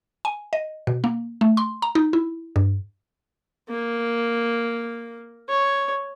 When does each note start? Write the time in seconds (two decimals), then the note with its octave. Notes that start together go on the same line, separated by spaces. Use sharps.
0.25 G#5
0.53 D#5
0.87 B2
1.04 A#3
1.41 A3
1.57 C6
1.82 A#5
1.95 D#4
2.13 E4
2.56 G2
3.69 A#3
5.49 C#5